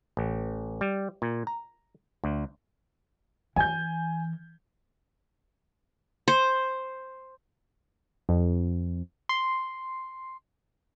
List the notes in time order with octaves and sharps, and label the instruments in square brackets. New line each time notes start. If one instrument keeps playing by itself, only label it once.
[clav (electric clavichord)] A1
G3
A#2
A#5
D2
[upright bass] E3 [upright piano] G#5 G6
[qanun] C5
[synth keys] F2
C6